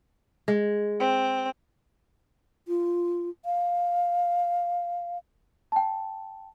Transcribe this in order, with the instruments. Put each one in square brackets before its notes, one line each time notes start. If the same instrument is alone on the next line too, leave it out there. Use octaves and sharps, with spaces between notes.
[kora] G#3
[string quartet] C4
[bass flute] F4
F5
[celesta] G5 A5